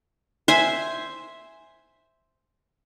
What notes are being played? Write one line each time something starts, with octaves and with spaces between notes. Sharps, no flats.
C5 E5 G#5